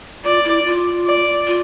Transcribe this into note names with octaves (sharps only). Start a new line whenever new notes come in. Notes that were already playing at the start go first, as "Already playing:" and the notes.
F4 D5
E4
F4
D5
F4